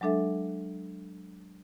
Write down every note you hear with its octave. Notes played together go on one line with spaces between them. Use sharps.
F#3 G#3 D4 A4 E5